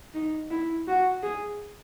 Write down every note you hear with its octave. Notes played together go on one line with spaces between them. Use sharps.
D#4
E4
F#4
G#4